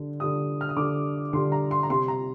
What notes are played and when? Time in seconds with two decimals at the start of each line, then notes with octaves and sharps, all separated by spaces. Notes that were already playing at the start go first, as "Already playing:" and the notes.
Already playing: D3 G3
0.20 D3 G3 D#6
0.61 F6
0.69 D#6
0.77 D3 G3 D6
1.33 D3 G3 C6
1.52 A#5
1.71 C6
1.83 A#5
1.90 C3 G3 C6
2.08 A#5